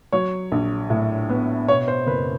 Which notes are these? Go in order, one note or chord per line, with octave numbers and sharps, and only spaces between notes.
F#3 C#5
A#1
A2
B3
B2 C#5
C5
F#1 B4